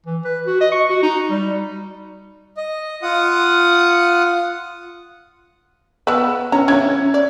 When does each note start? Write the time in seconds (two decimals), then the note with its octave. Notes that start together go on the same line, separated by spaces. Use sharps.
0.06 E3
0.25 B4
0.46 F#4
0.60 D#5
0.72 C#6
0.89 F#4
1.02 D#4
1.30 G3
2.57 D#5
3.02 F4 F#5 D#6
6.07 B3 B4 E6
6.52 C#4 A#5
6.68 E3 C#4 G#6
7.14 D5